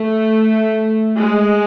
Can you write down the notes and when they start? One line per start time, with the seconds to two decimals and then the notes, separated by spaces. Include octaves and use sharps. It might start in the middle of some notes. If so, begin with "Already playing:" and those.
Already playing: A3
1.18 G#3